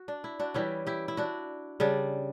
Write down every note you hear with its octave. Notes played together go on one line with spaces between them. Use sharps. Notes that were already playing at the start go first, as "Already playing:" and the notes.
Already playing: F#4
D4
E4
D4 F#4
E3 G3 C#4 E4 G4
E4 G4
E4
D4 F#4
C#3 G3 D4